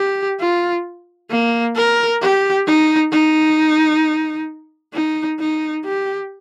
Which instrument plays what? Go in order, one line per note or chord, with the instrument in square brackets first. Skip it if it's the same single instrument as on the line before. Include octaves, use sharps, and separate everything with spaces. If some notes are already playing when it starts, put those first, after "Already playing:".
Already playing: [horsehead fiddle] G4
F4
A#3
A#4
G4
D#4
D#4
D#4
D#4
G4